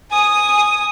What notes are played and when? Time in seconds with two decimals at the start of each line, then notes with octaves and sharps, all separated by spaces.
0.10 G#5 D#6